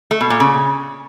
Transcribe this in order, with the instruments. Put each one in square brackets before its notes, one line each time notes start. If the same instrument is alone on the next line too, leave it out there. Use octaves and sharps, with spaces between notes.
[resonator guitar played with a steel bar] A3
B2
A#2
C#3